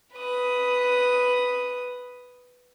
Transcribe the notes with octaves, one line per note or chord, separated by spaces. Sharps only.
B4 D#6